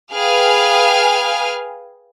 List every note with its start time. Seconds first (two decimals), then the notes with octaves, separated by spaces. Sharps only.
0.13 G#4 B4 F5 G5 G#5 F6